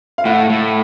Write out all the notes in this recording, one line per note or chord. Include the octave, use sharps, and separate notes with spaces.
F5
A2 F#5
A2